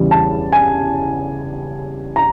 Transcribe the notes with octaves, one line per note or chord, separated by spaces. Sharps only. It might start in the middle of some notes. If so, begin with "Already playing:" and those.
Already playing: E2 C#3 E3 G3
A5
G#5
A#5